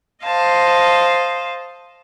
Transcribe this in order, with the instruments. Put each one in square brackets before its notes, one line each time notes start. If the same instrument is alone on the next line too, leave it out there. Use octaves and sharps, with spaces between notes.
[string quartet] C5 D#5 F5 A5